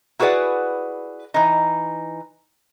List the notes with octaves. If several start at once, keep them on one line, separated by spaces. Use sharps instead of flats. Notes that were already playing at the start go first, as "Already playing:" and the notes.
E4 F#4 G#4 B4 D5 F#5
E3 D#4